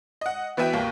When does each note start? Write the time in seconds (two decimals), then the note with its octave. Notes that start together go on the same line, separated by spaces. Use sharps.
0.21 D#5 F#5
0.57 E3 B3 F#4 E5 G5 D#7
0.73 C2 B2 A#3 G5